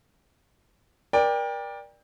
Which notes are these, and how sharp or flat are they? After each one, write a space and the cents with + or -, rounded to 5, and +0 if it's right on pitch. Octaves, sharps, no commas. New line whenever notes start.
A#4 +35 D5 +5 G5 +25